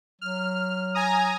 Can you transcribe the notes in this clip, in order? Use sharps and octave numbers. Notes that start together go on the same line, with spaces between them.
F#3 F6
G#5 A#5 D#6